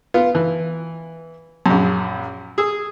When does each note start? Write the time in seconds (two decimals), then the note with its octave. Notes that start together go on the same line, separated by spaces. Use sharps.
0.14 B3 F4
0.35 E3
1.66 A#1 F#2
2.58 G#4 E6